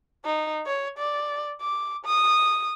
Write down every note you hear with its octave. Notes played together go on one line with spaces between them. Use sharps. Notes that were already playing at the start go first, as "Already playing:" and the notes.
D#4
C#5
D5
D6
D#6